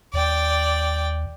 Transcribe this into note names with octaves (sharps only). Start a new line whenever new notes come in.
D#2 D5 G5